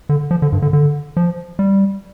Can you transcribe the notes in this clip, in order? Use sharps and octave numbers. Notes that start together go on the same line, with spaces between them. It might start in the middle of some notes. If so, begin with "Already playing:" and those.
D3
F3
D3
G2
D3
D3
F3
G3